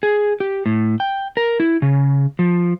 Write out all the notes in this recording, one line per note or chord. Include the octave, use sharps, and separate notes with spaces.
G#4
G4
A2
G5
A#4
E4
C#3
F3